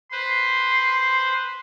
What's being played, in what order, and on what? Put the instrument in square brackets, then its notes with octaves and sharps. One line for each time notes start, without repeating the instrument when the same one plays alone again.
[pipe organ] B4 C5 [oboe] C6